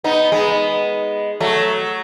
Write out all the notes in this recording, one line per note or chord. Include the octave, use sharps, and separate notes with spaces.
B3 D#4
G#3 B3
F#3 A3